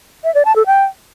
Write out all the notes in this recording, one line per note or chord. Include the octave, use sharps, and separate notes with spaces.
E5
D5
A5
A4
G5